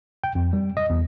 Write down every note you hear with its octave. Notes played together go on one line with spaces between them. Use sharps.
G5
F2
G3
D#5
E2